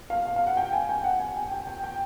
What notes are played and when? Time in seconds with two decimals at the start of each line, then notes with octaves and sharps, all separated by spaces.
0.10 F5
0.25 F5
0.36 F5
0.47 F#5
0.57 G5
0.73 G#5
0.89 G5
1.04 F#5
1.20 G#5
1.36 G5
1.51 G5
1.67 G5
1.84 G5